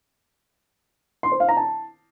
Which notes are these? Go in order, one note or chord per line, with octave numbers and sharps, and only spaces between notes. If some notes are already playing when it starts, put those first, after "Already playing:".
C6
C5
F5
A#5
A5